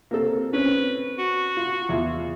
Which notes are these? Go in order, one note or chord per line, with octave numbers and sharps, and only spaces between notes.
A#3 C4 A4
C4 C#4 B4
F#4
F4
E2 F4